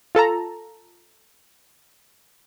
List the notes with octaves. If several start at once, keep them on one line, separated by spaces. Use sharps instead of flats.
F4 A4 A5 A#5